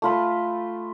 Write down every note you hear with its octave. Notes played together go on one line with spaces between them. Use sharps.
A3 F4 B5